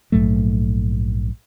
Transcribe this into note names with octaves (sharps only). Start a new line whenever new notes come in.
A#1 G#2 F#3 A3